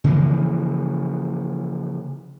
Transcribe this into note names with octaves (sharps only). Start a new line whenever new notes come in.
C#3 E3 F3 A#3